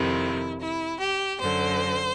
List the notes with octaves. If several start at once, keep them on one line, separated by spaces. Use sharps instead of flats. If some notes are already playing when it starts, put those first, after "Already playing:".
Already playing: F2 C3 D#3 E4
E4
G4
F#2 D3 C5